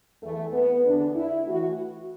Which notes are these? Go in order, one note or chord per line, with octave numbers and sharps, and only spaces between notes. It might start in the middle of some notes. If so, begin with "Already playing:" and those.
E2 E3 A3
B3
E2 D3 D4
E4
A2 E3 F#4